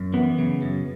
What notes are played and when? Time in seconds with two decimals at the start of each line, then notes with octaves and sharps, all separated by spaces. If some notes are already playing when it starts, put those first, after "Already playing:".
Already playing: F#2
0.13 E3 B3
0.38 C#3
0.62 F#2